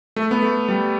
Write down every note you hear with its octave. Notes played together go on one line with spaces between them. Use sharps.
A3
B3
A3
G3